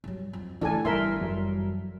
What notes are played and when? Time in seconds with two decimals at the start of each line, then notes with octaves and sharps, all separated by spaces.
0.04 G2 F#3
0.33 F2
0.61 A2 D3 E3 D4 A4 G#5
0.85 G1 G3 A#4 E5 C6
1.21 F#2 F#3